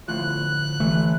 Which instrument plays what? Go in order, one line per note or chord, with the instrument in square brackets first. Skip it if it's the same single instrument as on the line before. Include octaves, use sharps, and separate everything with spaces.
[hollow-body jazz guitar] D2 A2 F3 [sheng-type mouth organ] F#6
[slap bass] E3 A3